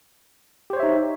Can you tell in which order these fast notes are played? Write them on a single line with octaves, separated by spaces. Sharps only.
G4 C5 C#5 E5 D#4